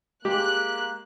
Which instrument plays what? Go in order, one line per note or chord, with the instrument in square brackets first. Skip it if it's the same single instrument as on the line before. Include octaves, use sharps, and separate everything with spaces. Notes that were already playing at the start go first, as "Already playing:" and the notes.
[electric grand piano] G#3 [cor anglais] A#3 [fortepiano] G4 [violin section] F#6